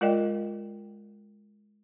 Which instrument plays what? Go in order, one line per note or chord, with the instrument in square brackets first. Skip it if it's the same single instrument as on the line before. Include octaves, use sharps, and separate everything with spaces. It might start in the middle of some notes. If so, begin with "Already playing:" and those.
[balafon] G#3 F4 A#4 D5 D#5 G5